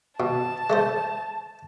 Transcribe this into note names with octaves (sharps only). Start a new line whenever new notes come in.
B2 A5
G#3 A3 C5